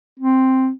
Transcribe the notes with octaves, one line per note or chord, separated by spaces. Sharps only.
C4